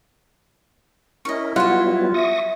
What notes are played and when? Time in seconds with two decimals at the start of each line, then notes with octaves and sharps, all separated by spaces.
1.25 C#4 E4 A#4 D#5 C#6
1.56 F#3 G3 B3 F4 F#4 F#5
2.14 E5 C#6 D#6 A#6